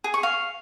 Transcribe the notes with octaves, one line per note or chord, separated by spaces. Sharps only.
G#4
C#6
F5